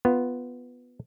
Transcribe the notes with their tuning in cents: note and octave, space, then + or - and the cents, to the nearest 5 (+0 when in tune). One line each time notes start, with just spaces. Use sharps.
B3 +0 F4 +0